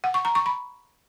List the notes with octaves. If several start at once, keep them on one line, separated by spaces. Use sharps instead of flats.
F#5
C#6
A#5
C#6
B5